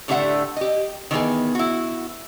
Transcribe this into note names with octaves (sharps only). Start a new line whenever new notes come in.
A2 D3 A3 G4 E5 F#5
G4 D#5
D#3 E3 B3 G#4
E4 F#4